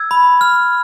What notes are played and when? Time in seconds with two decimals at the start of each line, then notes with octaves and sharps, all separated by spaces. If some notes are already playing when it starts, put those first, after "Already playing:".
Already playing: E6 G#6
0.11 B5
0.41 F6